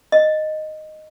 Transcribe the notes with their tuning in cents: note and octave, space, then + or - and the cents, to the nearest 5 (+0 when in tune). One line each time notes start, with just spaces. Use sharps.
D#5 -5